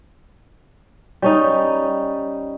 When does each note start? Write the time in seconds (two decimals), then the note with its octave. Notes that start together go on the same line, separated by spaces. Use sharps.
1.22 G3 C#4 D#4